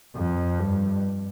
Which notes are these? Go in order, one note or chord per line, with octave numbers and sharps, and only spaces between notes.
F2
G2